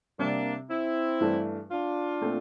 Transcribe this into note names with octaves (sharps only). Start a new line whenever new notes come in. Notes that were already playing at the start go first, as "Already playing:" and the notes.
C3 G3 A#3 C4 D4
C4 E4
G2 E3 A3 D4
D4 F4
A#2 A3 C4